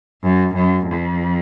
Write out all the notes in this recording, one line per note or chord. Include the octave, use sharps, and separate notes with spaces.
F#2
F#2
F2